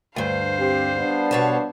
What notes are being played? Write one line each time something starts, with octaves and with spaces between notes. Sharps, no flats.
D2 G2 C5 F5
C4 G4
G3 B3 D4
B2 C#5 A5